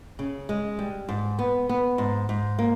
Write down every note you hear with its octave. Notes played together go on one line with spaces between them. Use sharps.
C#3
G#3
G3
G#2
B3
B3
G#2
G#2
A#3